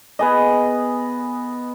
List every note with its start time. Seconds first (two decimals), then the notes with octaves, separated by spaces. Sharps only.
0.19 B3 G#4 D#5